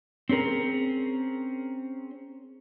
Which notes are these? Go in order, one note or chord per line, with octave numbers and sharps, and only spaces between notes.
C4 C#4 G#4 A#4